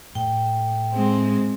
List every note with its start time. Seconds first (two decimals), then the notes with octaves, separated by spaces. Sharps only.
0.15 A2 G5
0.92 G#3 C4